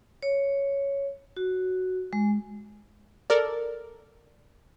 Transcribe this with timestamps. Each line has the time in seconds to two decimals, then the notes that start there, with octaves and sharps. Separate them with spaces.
0.23 C#5
1.37 F#4
2.13 G#3
3.30 A4 A#4 D5